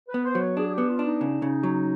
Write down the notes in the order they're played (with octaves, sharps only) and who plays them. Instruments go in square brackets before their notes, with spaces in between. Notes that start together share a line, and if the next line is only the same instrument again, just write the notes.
[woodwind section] B4
[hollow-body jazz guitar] B3
[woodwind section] C5
[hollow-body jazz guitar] F#3
[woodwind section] C#5
[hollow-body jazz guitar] D4 [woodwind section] G#4
[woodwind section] G#4
[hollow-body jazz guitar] B3 [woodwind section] G4
[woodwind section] F4
[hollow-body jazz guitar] D4
[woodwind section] D#4
[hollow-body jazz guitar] C#3
C#3
F#3